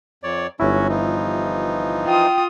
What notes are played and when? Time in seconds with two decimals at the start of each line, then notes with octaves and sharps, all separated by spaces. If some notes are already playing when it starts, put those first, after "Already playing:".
0.23 F2 C#5 D5
0.60 G1 F#3 C#4 E4 F#4
0.89 E3 F3 D#4
2.06 F4 G5 D#6